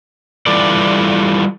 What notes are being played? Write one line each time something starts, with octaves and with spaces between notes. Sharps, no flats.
E3 G3 F4 A4 B4 D5